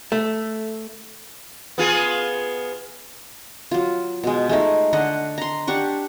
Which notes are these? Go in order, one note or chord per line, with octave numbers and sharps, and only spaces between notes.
A3
B3 F4 G#4
F#3 F4
B2 G#3
G#3 A3 D#4
D3 D4 D#5 F#5
A#5 C6
D4 G4 F#5 C#6